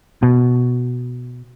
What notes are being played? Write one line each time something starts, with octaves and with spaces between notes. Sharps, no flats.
B2